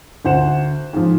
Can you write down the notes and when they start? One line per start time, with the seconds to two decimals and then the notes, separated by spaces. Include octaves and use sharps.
0.25 D2 C5 F#5 E7
0.93 G#2 F3